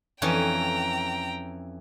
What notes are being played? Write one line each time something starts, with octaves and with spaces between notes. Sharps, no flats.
F2 E3 C#4 G5 A#5